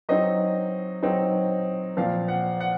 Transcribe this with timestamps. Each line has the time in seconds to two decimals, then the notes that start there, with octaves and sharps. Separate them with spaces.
0.09 F#3 C4 D#4 D#5
1.03 F#3 C4 D#4
1.97 A#2 F3 C4 F5
2.28 F#5
2.60 F#5